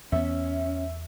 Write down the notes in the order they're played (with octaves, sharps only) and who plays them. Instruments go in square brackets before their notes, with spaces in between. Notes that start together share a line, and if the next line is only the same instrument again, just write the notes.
[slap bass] E2 B3 [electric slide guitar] C#4 [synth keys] E5